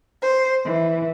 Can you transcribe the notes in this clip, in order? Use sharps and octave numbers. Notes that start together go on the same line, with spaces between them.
C5
E3